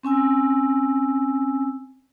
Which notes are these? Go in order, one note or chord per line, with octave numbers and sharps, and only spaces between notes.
C4 C#4 G#5 E6